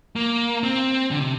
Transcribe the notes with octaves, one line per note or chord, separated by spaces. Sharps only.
A#3
C4
D3
C3